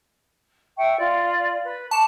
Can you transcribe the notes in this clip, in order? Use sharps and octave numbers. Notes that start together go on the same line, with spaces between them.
E5 G5 C#6
F4 D5
B4
A5 C#6 D6